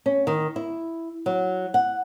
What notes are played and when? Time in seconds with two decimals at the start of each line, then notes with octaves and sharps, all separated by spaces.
0.06 C#4
0.27 D#3
0.56 E4
1.26 F#3
1.74 F#5